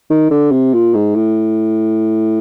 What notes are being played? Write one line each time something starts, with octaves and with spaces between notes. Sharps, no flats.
D#3
D3
C3
A#2
G#2
A2